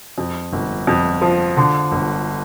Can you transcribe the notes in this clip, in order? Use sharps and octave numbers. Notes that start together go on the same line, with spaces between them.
F2
G1
F2
F3
D3
G1